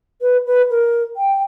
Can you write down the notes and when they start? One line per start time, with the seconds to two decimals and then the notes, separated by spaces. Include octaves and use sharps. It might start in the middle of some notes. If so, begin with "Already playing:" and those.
0.22 B4
0.47 B4
0.71 A#4
1.17 G5